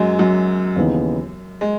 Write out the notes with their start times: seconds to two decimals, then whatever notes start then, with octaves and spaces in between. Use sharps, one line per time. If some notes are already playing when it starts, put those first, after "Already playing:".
Already playing: F#2 F#3 G#3
0.19 F#2 F#3
0.76 D#2 C#3 E3 B3 D#4
1.61 G#3